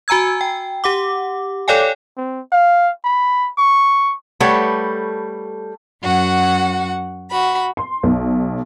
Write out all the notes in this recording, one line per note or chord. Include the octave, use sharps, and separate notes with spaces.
F#4 G#5 A#5 E6 G#6
G5
G4 F#5 D6
A4 C#5 D5 F5 G5 G#5
C4
F5
B5
C#6
G3 A3 A4 B4 C#5 F#5
F#2 F#4 F#5
F#4 B5
C6
B1